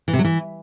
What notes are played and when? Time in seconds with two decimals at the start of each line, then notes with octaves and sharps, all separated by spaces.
0.08 E3
0.13 C3
0.19 F#3
0.25 E3